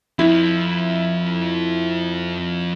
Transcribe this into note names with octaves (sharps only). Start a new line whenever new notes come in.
F2 F3 E4